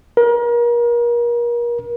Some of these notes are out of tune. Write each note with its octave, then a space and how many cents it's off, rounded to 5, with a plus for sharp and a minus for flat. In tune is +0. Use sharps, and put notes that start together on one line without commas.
A#4 +35